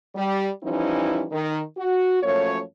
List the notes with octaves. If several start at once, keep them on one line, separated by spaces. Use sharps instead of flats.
G3
E3 F3 G3 C#4 D#4 E4
D#3
F#4
F#2 F3 A3 A#3 C#5